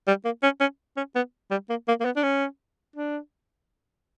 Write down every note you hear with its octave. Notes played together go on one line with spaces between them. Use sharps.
G3
A#3
C#4
C#4
C#4
B3
G3
A#3
A#3
A#3
B3
D4
C#4
D4